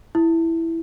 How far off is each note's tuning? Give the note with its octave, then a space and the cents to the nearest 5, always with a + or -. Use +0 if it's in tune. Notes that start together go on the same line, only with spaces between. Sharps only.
E4 +0